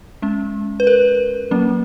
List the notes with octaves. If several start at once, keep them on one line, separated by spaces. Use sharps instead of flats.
G#3 C#4
B4
A#4
F#3 A#3 C#4